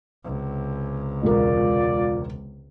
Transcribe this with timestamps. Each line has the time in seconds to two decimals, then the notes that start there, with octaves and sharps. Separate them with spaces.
0.24 C#2 C3
1.23 E1 F4 A#4 D5